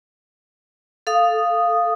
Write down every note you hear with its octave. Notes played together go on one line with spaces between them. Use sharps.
A4 F5 D#6